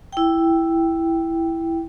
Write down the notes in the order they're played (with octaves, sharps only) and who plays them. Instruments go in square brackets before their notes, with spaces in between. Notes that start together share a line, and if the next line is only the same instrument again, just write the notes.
[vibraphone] E4 G5